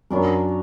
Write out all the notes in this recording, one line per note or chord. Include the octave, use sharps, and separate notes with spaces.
F#2 F#3 B3 D4 A#4